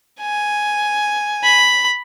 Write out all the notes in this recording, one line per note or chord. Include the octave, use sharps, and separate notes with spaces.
G#5
B5